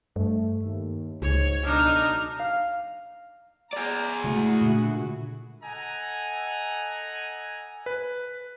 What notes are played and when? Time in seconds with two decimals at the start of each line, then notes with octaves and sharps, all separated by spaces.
0.16 G2 A3
0.63 D#2
1.22 C#2 G#2 C#5
1.65 B1 D4 D#4 A#5 F6
2.39 F5
3.73 G#4 D5 A#5
4.24 A2 C#3 G#3 A3 E4 F#4
4.61 A#2 D3
5.62 A4 D#5 F#5 G#5 A#5
7.86 B4